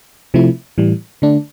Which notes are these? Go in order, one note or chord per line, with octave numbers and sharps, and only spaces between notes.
C3 F3 A3 E4
A2 E3 G3
D3 A3 D4